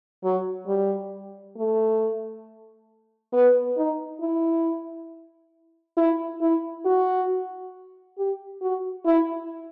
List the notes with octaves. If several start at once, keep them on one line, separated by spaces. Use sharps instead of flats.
F#3
G3
A3
B3
D#4
E4
E4
E4
F#4
G4
F#4
E4